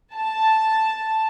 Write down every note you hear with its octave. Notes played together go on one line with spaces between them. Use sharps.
A5